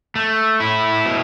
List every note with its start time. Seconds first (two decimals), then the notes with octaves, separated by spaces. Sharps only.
0.15 A3
0.60 E4
1.05 B2